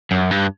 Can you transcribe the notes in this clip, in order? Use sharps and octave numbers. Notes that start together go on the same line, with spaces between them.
F#2
G2